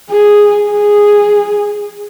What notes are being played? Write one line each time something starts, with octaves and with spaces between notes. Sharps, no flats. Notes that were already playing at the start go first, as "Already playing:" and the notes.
G#4
G#4